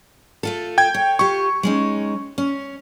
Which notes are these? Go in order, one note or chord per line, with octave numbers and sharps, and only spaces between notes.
A3 F4 A4
G5 G#6
C#5
F4 G4 C#6
G#3 C#4 D#4
C#4